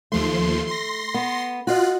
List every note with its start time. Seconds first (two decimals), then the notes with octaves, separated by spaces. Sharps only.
0.12 D#2 F3 A3 C6
0.67 C6 A#6
1.14 B3
1.67 F4 F#4 D#5 F#6